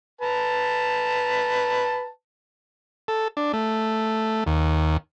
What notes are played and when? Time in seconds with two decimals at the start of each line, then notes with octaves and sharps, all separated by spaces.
0.21 B4 A5 A#5
3.08 A4
3.37 D4
3.53 A3
4.47 D#2